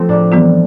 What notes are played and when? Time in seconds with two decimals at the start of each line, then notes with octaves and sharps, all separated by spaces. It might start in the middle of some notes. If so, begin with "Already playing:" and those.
Already playing: F3 A3 C4
0.09 A2 D4
0.32 E3 G3 B3 F4